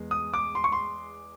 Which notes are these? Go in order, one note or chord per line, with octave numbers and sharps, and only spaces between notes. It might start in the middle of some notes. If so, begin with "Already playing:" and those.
Already playing: E2 G#3
D#6
D6
C6
C#6
C6